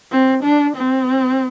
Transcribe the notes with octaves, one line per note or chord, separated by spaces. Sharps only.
C4
D4
C4